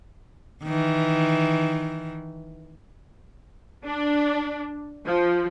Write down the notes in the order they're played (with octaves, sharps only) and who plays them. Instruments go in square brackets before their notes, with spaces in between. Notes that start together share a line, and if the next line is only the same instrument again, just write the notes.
[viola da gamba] D#3 E3
[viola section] D4
F3